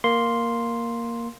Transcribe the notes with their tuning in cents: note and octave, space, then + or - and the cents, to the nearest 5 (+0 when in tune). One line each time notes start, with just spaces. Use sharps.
A#3 +0 C6 +0